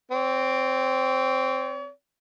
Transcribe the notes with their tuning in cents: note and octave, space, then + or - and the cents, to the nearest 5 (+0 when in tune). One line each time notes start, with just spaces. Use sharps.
C4 +0 C#5 +40